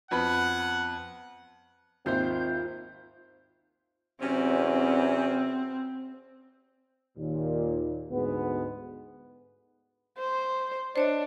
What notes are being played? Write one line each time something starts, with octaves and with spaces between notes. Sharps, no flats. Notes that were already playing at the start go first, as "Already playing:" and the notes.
F2 B3 F#5 B5
G#1 D#2 C4 F4 C5 E5 G6
E2 C3 F#3 C4 C#4
D#2 A#2
D2 G#2 G#3 B3
C5
D4 C5 C#5 D#5